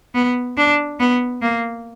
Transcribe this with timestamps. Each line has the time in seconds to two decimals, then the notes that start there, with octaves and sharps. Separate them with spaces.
0.15 B3
0.57 D4
1.00 B3
1.42 A#3